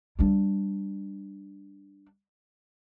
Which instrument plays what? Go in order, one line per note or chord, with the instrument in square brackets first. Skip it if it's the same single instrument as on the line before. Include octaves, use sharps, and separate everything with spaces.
[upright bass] G3 D4